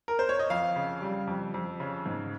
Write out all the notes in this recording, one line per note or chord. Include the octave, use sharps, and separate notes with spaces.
A#4
C5
C#5
D#5
F2 F5
C#3
G3
F2
F2
C#3
G#2